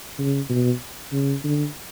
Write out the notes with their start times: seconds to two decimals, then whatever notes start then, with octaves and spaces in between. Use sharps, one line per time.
0.19 C#3
0.50 B2
1.12 C#3
1.44 D3